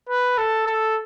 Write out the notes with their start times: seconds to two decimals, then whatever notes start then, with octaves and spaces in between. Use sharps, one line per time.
0.09 B4
0.38 A4
0.66 A4